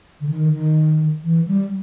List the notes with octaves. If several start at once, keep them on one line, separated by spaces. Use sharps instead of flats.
D3
D#3
D#3
E3
G3